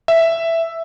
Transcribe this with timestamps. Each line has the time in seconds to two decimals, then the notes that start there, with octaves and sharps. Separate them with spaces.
0.08 E5